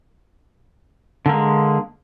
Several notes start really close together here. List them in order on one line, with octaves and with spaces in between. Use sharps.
D3 A#3 G#3